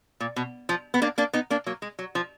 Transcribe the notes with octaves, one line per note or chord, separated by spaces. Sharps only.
A#2
B2
F3
B3
A#3 D4
A#3 D4
B3 D#4
A#3 D4
F#3 A#3
G#3
F#3
F3